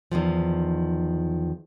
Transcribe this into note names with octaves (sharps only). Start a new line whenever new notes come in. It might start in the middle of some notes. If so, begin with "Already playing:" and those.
E2 G2 D#3 F3